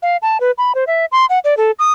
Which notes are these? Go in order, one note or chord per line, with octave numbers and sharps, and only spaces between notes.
F5
A5
B4
B5
C5
E5
C6
F#5
D5
A4
D#6